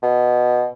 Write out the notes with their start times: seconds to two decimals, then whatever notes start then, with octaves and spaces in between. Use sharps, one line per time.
0.02 B2